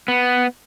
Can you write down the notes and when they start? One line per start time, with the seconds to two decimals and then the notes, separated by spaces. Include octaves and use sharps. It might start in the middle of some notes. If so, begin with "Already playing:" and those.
0.08 B3